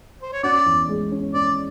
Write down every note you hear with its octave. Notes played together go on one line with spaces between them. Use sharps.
C5
C#5
C#4 F#4 D5
E2
G#3
C#4
C#4 D5